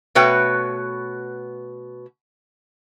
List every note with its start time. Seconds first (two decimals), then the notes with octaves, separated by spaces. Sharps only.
0.15 B2 A3 F#4 B4 C#5 G5